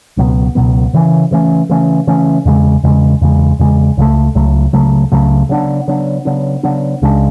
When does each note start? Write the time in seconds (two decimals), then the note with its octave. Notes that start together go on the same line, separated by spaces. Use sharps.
0.17 C#2 B2 F#3 B3
0.55 C#2 B2 F#3 B3
0.93 C#3 E3 A3 C#4
1.31 C#3 E3 A3 C#4
1.69 C#3 E3 A3 C#4
2.07 C#3 E3 A3 C#4
2.45 E2 C#3 G#3
2.83 E2 C#3 G#3
3.21 E2 C#3 G#3
3.59 E2 C#3 G#3
3.97 C#2 C#3 F#3 A3
4.35 C#2 C#3 F#3 A3
4.73 C#2 C#3 F#3 A3
5.12 C#2 C#3 F#3 A3
5.49 C#3 F#3 B3 D4
5.88 C#3 F#3 B3 D4
6.25 C#3 F#3 B3 D4
6.63 C#3 F#3 B3 D4
7.02 C#2 C#3 G#3 D4